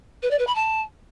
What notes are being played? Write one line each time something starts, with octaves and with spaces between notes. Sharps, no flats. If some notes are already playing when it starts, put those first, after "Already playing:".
B4
D5
B4
B5
A5